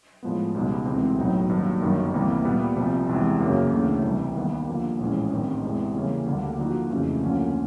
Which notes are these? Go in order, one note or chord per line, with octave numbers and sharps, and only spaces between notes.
A2 F3 G#3 B3
C#2 B2 G3 B3 D#4
D2 C3 E3 G#3 C4
B1 A2 F#3 B3 D#4
G2 D#3 F#3 A#3
G1 F#2 D#3 G3
D2 C3 E3 G3 A#3
A#2 G3 B3
C2 C3 F3
E2 C3 E3 G#3
F#2 C#3 F#3 A#3
D2 C#3 E3 A3 D4
C2 C3 E3 G3
D#2 D#3 G3 B3
D3 F3 A#3
A#1 A2 E3 G#3 C#4
A1 G2 D#3 G3 C4
E2 C3 E3 G#3
C#3 E3 G3 A#3 C#4
D2 D3 G3 A#3 D4
D3 F3 A#3 D#4 F#4
F2 C#3 E3 A3 C#4
D2 D3 F3 A#3 C#4